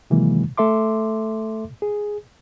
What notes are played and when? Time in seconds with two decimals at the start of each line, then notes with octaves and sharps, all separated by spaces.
0.10 C3 D#3 E3 F#3 G#3 A#3
0.57 A3 A4 E5 C6 D6
1.82 G#4